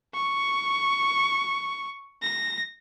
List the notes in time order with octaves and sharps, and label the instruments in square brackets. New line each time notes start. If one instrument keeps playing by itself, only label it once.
[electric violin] C#6
A#6